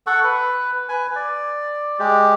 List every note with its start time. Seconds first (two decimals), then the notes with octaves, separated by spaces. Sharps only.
0.07 A4 F#5 C#6
0.24 B4
0.89 B4 G#5
1.16 D5
1.99 G#3 G4